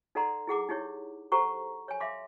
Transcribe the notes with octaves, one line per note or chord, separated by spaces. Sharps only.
D#4 A4 D5 F#5 A#5 C6
E4 G#4 F#5 D6
D#4 E4 G4 C#5
G4 A4 C5 F#5 A#5 C#6
C#5 G#5
E5 F5 C6 D6